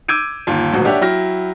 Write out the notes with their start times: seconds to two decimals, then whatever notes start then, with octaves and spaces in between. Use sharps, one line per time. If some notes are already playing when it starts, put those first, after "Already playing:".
0.09 D6 E6 G6 G#6 D7 D#7
0.47 G1 D#2 F4
0.73 D#1 D2 G#2 F#3 F#4
0.85 D4 G4 C#5 E5 F#5
1.01 F#3 E4 G5 F6 A#6